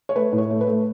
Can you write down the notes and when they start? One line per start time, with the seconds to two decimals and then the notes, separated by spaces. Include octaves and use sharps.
0.09 C#5
0.16 A3 B4
0.32 A2
0.38 C#5
0.50 A3
0.61 B4
0.67 A3